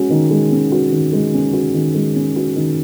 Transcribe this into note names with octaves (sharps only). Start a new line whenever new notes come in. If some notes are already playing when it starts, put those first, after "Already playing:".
Already playing: G#3 C#4 F#4
D#3
G#3
C#4
F#4
D#3
G#3
C#4
F#4
D#3
G#3
C#4
F#4
D#3